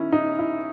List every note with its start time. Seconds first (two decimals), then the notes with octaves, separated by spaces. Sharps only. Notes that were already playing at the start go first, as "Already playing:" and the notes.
Already playing: D#3 C#4 E4
0.12 D#4
0.39 E4